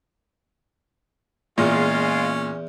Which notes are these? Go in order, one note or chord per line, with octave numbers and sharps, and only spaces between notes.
E2 A#2 G#3 C#4 F4